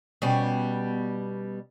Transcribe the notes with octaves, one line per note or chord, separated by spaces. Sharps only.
B2 G3 C#4